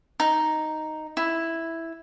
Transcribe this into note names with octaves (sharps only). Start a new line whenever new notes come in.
D#4
E4